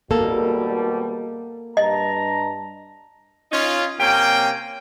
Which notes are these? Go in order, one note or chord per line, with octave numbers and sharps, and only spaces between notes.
G#1 B2 G3 A#3 A4
G2 D#5 A5 A#5
C#4 D#4 F4
C3 A#3 C#4 G5